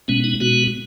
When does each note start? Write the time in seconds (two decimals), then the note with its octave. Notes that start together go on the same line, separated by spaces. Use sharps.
0.08 B2 G#3 B3 C#4
0.24 D#4
0.40 B2 G#3 B3 F#4